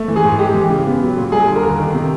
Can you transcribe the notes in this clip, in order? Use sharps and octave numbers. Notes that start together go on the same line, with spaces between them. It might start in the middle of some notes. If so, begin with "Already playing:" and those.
Already playing: A3
E3
G#4
G#2
G#3 G4
E3
C#3
B3
F#3
A#2
G3 G#4
D3
A#4
D#2
D#3
C3